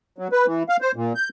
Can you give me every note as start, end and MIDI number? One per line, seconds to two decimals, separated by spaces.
0.18 0.28 54
0.32 0.46 71
0.46 0.63 52
0.69 0.77 77
0.81 0.92 72
0.96 1.13 46
1.15 1.29 91